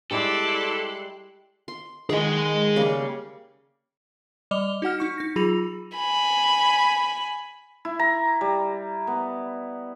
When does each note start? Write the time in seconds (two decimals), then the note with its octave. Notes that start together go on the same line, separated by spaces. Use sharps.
0.11 G3 G#3 E4 G4 A4 D5 C6 F#6
1.68 C6
2.10 D#3 G#4 D#5 F#5 B5
2.76 C#3 G3 A#3
4.51 G3 D5 D#5 D6 F7 G7
4.82 D#4 F#4 F#5 F6
4.99 D#4 C#6 C#7
5.18 D#4 A#6
5.36 F#3 F4 G#4 B5 A#6 F7
5.97 G#5 B5
7.85 E4
7.99 A#5
8.41 G3
9.07 B3